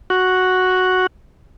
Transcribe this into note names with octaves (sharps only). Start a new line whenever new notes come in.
F#4